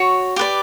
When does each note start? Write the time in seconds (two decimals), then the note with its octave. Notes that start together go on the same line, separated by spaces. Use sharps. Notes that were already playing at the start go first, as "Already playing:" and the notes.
Already playing: F#4 C#5
0.36 G4 B4 D5